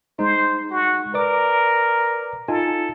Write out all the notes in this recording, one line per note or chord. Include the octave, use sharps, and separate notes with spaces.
G#3 D#4 C5
F#4
A#4 B4 D5 D6
D#4 F4 A4 G#5